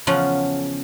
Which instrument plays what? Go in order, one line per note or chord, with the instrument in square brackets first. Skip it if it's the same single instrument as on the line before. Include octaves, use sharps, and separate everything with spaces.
[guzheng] E2 C#3 F3 C#4 F4 F#5